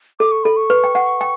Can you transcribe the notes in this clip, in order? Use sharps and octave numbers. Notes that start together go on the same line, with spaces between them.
A4 D6
C#6
A4 B5
C#6
B4
G5
F#5
G5